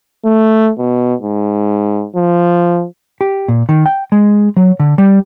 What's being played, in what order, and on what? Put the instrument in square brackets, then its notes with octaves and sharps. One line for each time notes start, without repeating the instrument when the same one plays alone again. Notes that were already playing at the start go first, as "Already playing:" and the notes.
[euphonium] A3
B2
G#2
F3
[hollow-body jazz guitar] G4
A#2
D#3
G5
G#3
F#3
D3
G3